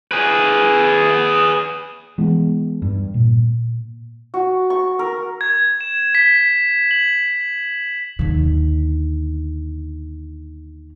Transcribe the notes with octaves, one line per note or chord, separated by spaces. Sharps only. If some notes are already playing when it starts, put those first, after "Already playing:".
G#4 B4
E3 G#3 B3
G2
A#2
F#4
C#6
A#4
G#6
E7
B6
F#7
D#2 D3